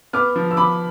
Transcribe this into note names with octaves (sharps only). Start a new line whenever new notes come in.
B3 D6 F6
F3
E6
B3 B5 D6